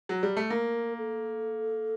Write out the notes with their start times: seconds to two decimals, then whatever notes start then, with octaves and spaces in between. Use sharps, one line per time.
0.09 F#3
0.23 G3
0.37 A3
0.50 A#3 A#4
0.98 A4